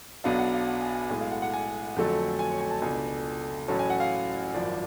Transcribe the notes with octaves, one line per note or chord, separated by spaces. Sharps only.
B1 B2 F#3 B3 D4 F5
F#5
F5
F#5
G#5
G#5
B1 A2 G#3 G#5
F5
F#5
F#5
G#5
F2 D3 F#3 A3
G#5
C#5
G#5
A5
C#2 B2 A3 D4 G#5
A1 A2 F#3 C#4 A5
G#5
F#5
F5
G#1 F#2 F3 D5